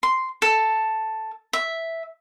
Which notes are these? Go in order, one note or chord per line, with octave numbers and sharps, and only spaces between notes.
C6
A4
E5